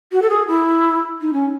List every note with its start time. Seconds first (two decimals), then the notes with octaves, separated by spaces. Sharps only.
0.11 F#4
0.21 A4
0.29 G#4
0.47 E4
1.21 D#4
1.33 C#4